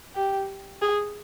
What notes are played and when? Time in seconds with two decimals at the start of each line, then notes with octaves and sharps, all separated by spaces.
0.15 G4
0.81 G#4